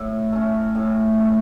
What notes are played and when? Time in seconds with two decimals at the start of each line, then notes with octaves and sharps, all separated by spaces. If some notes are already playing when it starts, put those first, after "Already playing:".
Already playing: A2
0.32 A3 C#4
0.75 A2
1.17 A3 C#4